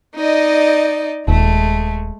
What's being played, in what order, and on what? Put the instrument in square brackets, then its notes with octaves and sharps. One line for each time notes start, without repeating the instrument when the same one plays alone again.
[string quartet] D#4 D5 D#5
[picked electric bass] D#1 [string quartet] G#3 A3